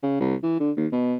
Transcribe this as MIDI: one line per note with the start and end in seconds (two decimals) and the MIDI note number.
0.03 0.17 49
0.20 0.35 36
0.43 0.57 52
0.60 0.71 50
0.77 0.87 39
0.92 1.16 47